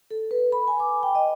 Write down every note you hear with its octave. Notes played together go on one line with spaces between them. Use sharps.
A4
B4
B5
G#5
D6
G5
D#5